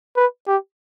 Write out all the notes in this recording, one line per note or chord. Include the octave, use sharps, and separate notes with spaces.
B4
G4